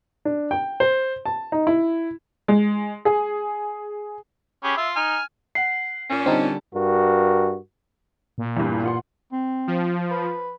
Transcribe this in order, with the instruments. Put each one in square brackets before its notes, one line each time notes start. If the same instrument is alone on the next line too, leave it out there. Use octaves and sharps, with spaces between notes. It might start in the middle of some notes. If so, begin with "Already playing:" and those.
[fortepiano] D4
G5
C5
A5
D#4
E4
[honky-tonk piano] G#3
G#4
[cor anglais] C#4 [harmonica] G4 G#4 B5
[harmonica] F4 [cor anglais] E5
[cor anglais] D#4 [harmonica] G#5 F6
[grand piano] F#5 [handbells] C7
[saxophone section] A#2 C#4
[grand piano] D3 G3 A5 [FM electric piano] C4 D#4
[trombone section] G2 F#4 A#4
[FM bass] A#2
[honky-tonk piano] E2 G2
F4 F#5 C6
[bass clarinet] C4
[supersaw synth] F3
[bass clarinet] B4